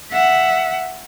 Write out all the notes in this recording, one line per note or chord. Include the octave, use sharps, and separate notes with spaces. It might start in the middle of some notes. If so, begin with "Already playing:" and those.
E5 F#5